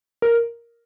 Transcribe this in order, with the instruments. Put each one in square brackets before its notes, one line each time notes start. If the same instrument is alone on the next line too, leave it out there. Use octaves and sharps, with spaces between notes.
[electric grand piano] A#4